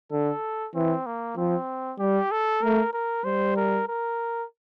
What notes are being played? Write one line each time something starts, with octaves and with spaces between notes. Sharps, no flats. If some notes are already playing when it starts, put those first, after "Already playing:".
D3 A4
E3 C4
A#3
F3 C4
G3 G4
A4
A3 A#4
A#4
G3 C5
A#4
A#4